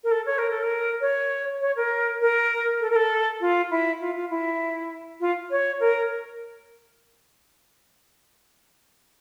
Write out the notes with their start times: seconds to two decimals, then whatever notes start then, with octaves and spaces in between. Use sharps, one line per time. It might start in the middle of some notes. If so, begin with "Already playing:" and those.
0.04 A#4
0.11 A4
0.26 C#5
0.38 A#4
0.50 A4
0.62 A#4
1.01 C#5
1.61 C#5
1.76 A#4
2.21 A#4
2.81 A4
2.90 A#4
2.96 A4
3.41 F4
3.71 E4
4.01 F4
4.15 F4
4.30 E4
5.20 F4
5.51 C#5
5.80 A#4